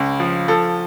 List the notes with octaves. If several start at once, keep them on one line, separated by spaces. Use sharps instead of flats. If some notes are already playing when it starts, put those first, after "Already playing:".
Already playing: C#2 C#3
F3
F3 A4